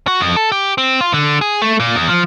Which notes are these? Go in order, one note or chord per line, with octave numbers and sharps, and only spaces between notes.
F#4
F2
A4
G4
C4
F4
D3
G#4
A3
A#2
E2
F3